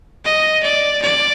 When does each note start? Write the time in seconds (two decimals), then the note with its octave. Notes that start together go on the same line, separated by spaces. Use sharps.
0.25 D#5
0.63 D5
1.02 D5